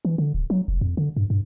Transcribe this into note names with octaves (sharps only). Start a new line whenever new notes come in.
E3
D3
D1
F#3
F1
F2
D3
G2
G2